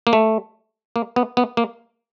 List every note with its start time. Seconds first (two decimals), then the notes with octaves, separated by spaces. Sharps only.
0.07 A#3
0.13 A3
0.96 A#3
1.16 B3
1.37 B3
1.57 A#3